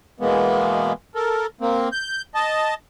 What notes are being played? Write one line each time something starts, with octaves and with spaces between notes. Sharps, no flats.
B2 E3 G#3 A#3 B3
A4 A#4
A#3 C4
G6
D#5 A5